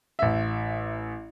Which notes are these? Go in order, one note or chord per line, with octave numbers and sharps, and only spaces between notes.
A1 E5